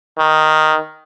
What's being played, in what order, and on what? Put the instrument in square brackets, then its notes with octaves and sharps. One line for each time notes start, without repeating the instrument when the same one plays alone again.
[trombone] D#3